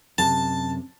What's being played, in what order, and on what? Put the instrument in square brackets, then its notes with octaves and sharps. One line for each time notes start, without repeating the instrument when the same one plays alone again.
[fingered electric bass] F#2 C3 [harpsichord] A5